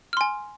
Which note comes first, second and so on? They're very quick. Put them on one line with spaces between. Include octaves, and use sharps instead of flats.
F6 C6 G#5